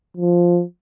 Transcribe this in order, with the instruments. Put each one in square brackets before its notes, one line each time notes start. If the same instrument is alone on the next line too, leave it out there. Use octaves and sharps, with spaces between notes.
[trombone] F3